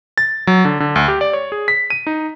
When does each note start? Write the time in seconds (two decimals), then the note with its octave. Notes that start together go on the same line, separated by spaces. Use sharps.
0.18 A6
0.47 F#3
0.65 D3
0.80 D3
0.96 D2
1.08 G4
1.21 D5
1.33 C#5
1.52 G#4
1.68 B6
1.90 D#7
2.07 D#4